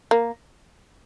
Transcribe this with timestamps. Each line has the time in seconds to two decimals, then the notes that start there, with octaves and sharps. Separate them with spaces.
0.11 A#3